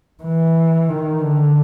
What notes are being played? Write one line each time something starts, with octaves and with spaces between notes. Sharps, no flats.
E3
D#3
D3